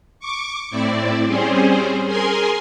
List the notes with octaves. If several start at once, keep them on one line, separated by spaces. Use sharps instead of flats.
C#6 D6
A2 C4 E4 D5
G3 C4 C#4 G#4 C5
G#4 A#4 G#5 C6